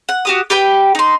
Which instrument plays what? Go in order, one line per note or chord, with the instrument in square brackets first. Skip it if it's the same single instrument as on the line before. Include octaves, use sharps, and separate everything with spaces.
[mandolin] F#5
F#4 G4 D#6
G4 B4 G5
D#4 C6